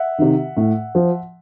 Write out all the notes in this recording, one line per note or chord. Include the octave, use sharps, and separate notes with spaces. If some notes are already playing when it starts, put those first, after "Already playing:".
Already playing: E5 F#5
C3 D#3
A2
F3